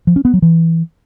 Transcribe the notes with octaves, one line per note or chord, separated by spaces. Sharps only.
F3
C#4
B3
F#3
E3